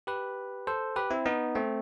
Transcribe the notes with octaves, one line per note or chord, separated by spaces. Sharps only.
G4 B4
A4 C5
G4 B4
C4 E4
B3 D#4
A3 C4